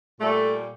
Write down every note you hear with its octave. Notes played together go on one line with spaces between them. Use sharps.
A#2 G3 A3